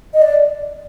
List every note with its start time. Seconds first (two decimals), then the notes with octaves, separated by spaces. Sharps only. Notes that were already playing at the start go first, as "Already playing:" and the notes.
0.14 D#5
0.22 D5